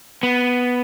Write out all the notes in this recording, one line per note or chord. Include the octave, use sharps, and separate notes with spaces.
B3